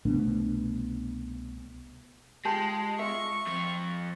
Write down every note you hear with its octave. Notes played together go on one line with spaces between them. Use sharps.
C2 B2 A3 D4
G#3 F4 G4 A5
F4 E5 C#6
F2 F3